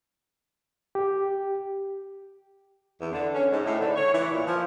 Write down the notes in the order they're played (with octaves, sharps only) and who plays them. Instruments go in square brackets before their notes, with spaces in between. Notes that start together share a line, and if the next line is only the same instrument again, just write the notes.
[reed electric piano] G4
[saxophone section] E2
D3
C#4
G#2
A2
D3
C#5
E3
A#2
F3